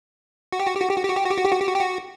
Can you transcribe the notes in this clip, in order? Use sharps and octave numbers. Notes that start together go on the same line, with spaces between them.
F#4
G4
F#4
G4
F#4
G4
F#4
G4
F#4
G4
F#4
G4
F#4
G4
F#4
G4
F#4
G4
F#4